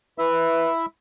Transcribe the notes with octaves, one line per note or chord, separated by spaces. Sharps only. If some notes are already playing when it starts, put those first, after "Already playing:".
E4 B4 E5